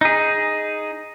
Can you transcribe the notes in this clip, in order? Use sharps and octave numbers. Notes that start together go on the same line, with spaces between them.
D#4 G#4